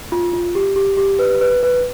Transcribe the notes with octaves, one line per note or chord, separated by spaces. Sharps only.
F4
F4
G4
G4
G4
B4
B4
B4